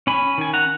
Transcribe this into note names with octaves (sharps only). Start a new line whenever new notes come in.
C#4 G#5 B5
D#3 G#5
F#5 A#5